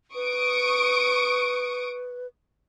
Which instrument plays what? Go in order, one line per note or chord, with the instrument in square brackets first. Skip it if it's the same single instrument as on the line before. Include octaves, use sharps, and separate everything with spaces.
[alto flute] B4 [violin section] C#6 D#6 D7